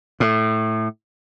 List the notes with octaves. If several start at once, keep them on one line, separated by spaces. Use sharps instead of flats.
A2